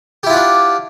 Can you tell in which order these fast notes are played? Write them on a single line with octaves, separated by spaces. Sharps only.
G4 E4 F4 F#5 D4